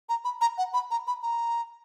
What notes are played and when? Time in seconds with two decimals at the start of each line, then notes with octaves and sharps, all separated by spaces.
0.09 A#5
0.24 B5
0.41 A#5
0.58 F#5
0.74 B5
0.91 A#5
1.07 B5
1.22 A#5